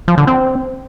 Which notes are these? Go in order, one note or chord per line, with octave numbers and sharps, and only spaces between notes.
F3
D3
C4